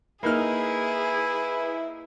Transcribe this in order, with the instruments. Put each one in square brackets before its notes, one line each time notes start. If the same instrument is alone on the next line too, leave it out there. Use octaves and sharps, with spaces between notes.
[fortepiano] A#3 D#4 F6 [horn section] E4 [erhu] G#4 [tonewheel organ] B4